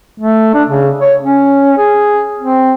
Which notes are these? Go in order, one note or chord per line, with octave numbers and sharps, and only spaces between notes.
A3
D4
C#3
C#5
C#4
G#4
C4